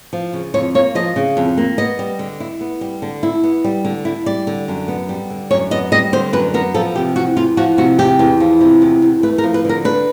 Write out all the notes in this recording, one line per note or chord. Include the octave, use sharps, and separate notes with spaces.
F3
C#3
F2 C#5
A#3 C#5
F3 D#5
C#3
F2
A#3
B3 D#5
G3
D3
E4
B3
G3
D3
E4
B3
G3
D3
E4
G3 D5
D3
F#2
B3
G3
D3
F#2 C#5
B3 D#5
G3 D#5
D3 C5
F#2 B4
B3 A#4
F3 A4
C3 G4
E2 F#4
E2 F4
F3 F#4
C3 F#4
E2 G4
E2
F3
C3
E2
E2
A3 B4
A#4
F3
B4
D3 A#4
D4 B4